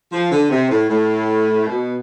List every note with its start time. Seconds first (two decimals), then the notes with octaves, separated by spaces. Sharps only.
0.11 F3
0.30 D3
0.50 C3
0.69 A2
0.89 A2
1.66 B2